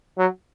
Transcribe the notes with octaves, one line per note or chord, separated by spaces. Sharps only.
F#3